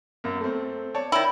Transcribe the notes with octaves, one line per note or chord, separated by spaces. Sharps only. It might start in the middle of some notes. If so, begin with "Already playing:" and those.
F#2 A#3
A3 C4
C#5 D5 A5
D#3 E4